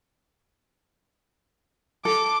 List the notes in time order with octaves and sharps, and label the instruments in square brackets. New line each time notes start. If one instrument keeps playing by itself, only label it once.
[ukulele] A4 [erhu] D6